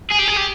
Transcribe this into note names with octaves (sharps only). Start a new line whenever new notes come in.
G#4
G4
G#4
G4